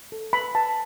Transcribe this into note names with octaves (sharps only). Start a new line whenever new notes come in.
A4
B4 B5
B4 A5